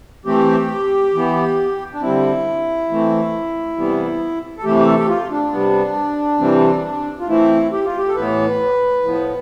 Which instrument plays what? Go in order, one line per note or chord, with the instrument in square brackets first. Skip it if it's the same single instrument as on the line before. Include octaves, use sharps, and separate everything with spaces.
[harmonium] E3 A3 C4 G4
E3 B3
D4
D3 G3 C4 E4
E3 A3 C4
C3 E3 G3 B3
A4
C3 E3 A3 G4
G4
A4
G4
F4
D4
C3 G3 B3
C3 E3 G3 C4
F4
E3 A3 C4 E4
G4
F4
G4
A4
A2 E3 B3 B4
A2 F3 B3